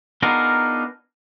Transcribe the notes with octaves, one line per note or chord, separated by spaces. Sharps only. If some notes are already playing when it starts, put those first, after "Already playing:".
B3 D4 D#4 F4 G#4 A#4